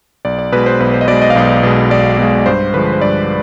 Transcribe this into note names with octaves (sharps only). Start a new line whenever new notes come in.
B1 D5
D5
B2 G#3 B4
C5
B1 B4
C5
D#5
B2 G#3 D5
D#5
F5
B1 D#5
B2 G#3
B1 D5
B2 G#3
G2 C5
D3 F3 G#3 B4
C5
G2 D5